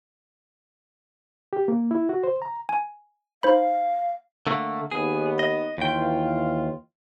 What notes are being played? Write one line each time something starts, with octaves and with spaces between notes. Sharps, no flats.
G4
A#3
E4
F#4
C5
A#5
G#5
D#4 C5 F5 B5
D3 A3 A#3
D#2 D#3 B3 G#4
D#5
D#2 E3 F4 G5